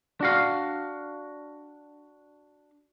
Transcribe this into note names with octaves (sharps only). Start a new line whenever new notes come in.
D4 F#4 F5